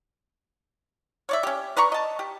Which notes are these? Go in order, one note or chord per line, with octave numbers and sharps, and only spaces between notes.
C#5 D5 E5
C#4 G4
B4 D5 A#5 C#6
D#5 A5
G4